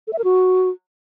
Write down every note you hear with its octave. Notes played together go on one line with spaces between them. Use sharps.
A4
E5
A#4
F#4